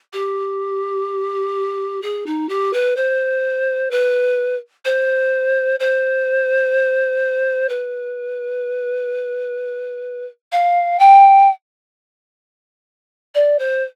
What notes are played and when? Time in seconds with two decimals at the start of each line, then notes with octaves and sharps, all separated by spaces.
0.13 G4
2.02 G#4
2.26 D#4
2.49 G4
2.73 B4
2.96 C5
3.91 B4
4.85 C5
5.80 C5
7.69 B4
10.52 F5
10.99 G5
13.35 D5
13.59 C5